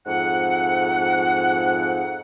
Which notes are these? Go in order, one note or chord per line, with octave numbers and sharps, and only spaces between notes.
F2 G#2 F#5